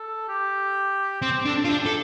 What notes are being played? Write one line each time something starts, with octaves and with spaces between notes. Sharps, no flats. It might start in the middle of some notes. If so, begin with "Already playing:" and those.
Already playing: A4
G4
C4 C5
G4
D4 A4
F4
D4 G4
A4